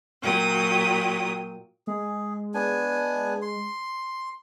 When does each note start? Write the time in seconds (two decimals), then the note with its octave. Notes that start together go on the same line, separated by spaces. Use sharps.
0.22 A#2 F#3 G5 D#6
1.87 G#3 G#4
2.54 B3 D4 G#5
3.42 C6